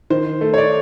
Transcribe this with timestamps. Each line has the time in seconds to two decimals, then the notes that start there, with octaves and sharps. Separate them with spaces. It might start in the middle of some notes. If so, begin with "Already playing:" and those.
0.10 D#3 C5
0.41 A3
0.54 C#5
0.58 D5